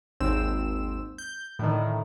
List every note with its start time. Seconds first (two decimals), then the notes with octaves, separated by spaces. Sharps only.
0.20 G#1 D#2 C4 E6 E7
1.18 G6
1.59 A2 D3 D#3